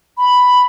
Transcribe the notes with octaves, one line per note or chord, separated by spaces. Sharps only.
B5